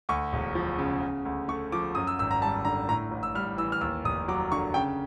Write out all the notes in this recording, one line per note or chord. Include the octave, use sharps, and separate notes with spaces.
D2 C#6
E1
F3
C#3
C#3
D2
A3 C#6
F3 D6
F#2 D#6
E6
G#1 E6
A#5
G3 A5
D3 A#5
A2 A#5
A1
E6
G3 F6
E3 E6
F6
D#2 E6
F1 D#6
F#3 D6
D3 C#6
C#3 G5